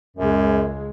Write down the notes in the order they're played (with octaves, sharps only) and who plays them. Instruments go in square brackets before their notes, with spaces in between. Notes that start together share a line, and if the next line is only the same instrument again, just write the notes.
[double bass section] C#2 G#3 [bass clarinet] F#2